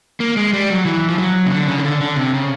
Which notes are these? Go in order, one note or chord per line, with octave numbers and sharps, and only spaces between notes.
A#3
G#3
G3
F#3
E3
F3
F#3
C#3
D3
C#3
D#3
D3
D3
C3
C#3